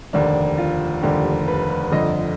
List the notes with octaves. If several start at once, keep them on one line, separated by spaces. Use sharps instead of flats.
F1 D#2 D3 D4
F4
F1 D#2 D3 G4
B4
G1 F2 D3 D#5